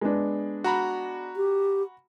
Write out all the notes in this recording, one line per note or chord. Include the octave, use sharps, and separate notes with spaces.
G#3 B3 D4
F#4 A#5 B5
G4